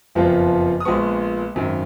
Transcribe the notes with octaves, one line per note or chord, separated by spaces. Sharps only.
F#1 F2 F3 B3 F4
D#6
A#1 A#2 G#3 B3 C#6
G#1 F#2 D#3